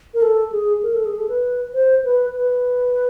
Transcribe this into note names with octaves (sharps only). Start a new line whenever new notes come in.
A#4
A4
G#4
A#4
A4
G#4
A4
B4
C5
B4
B4